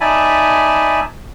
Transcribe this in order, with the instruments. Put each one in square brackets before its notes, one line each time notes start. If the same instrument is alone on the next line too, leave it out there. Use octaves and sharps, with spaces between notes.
[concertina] D#4 D5 E5 G#5 A5 B5